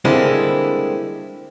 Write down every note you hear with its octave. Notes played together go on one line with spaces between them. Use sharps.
D3 G3 G#3 A#3 C4 E4